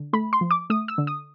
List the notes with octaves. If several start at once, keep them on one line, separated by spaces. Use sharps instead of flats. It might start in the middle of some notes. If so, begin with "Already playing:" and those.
Already playing: D3
A3 B5
C6
F3
D6
A3 D#6
E6
D3
D#6